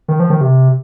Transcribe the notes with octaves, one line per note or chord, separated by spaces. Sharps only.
D#3
F3
D#3
C3